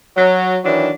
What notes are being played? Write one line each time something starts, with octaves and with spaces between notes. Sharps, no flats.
F#3
D#3 E3 F#3 D4